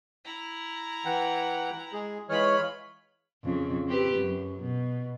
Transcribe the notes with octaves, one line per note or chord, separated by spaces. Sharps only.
E4 A#5
E3 F#5 G5
G#3 G#4
E3 G#3 F4 C#5 B5 F6
F2 C#3
C4 G4 B4
F#2
B2